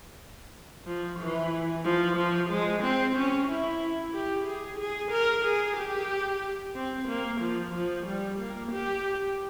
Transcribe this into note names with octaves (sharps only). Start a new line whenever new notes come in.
F3
E3
F3
F3
G#3
C4
C#4
E4
G4
G#4
G#4
A#4
G#4
G4
C4
A#3
F3
F3
G3
A#3
G4